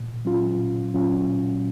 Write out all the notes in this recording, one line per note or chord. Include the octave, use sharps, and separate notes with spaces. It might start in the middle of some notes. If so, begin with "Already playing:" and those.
Already playing: A#2
F#3 C#4 F4
A#2
F#3 C#4 F4
A#2